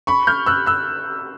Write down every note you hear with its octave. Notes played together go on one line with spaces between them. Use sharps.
B5 C#6
F6 G6
E6 F#6
E6 F#6